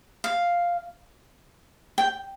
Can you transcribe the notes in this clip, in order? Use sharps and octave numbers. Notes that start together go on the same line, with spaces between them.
F5
G5